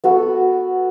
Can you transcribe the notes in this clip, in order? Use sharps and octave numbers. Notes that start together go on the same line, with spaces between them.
B3 F#4 A4